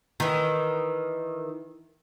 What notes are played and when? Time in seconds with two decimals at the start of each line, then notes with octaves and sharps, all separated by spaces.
0.20 D#3 E3